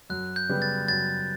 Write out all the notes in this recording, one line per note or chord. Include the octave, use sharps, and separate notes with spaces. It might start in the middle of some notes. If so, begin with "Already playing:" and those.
F#2 F#6
G6
C#3 G3 B3
A6
F#2 A6